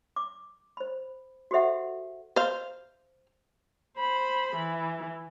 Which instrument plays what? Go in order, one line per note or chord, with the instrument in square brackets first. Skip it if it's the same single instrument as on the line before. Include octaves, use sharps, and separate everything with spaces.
[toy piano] D6
C5 B5
F#4 G4 A4 C5 E5 F#5
[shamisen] C5 F5
[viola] C5 B5
E3